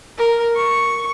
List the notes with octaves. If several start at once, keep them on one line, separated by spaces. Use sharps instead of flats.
A#4
C#6